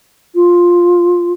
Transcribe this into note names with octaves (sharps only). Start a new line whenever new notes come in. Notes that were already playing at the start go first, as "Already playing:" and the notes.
F4